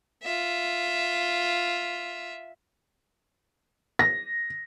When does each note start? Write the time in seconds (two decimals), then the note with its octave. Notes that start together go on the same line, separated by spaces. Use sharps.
0.23 F4 E5
3.99 A#6